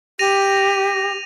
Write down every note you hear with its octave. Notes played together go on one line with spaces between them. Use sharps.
G4 A#6 D#7 F7